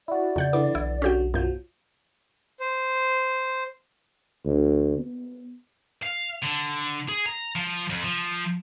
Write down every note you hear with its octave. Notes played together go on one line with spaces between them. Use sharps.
E4 F#4 D5
F2 C#3 F#5 G6
D3 E3 B3 D6
B1 E4
D3 F#3 C#4 G4 G5
F#2 B2 F3 F#3 G6
C5
D2
B3
F5
D3
G#4
A#5
F3
F2
F3